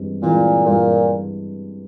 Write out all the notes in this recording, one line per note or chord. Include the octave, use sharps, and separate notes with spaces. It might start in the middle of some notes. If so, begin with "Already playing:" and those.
Already playing: G2 E3 G#3 C4
A#2 E3 G#3 C4
G2 A#2